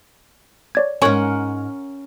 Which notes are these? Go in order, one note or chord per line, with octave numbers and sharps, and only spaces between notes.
C#5 D5 G#6
G#2 C#4 A#4 C#5 F#5 G#5 C#6 G#6